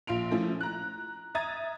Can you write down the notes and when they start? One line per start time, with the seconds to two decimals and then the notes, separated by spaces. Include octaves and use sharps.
0.07 A#1 F4 C6 D7 F7
0.31 F3 A3 C#4 E4
0.61 A#5 F#6
1.35 E5 A#5 D#6 G#6 A6 D#7